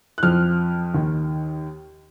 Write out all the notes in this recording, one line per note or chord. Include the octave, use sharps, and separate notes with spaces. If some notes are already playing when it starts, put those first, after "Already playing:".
F#6
F2 F3 F6
D#2 D#3